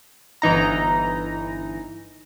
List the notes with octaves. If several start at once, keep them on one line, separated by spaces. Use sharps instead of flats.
G1 E3 D#4 A#5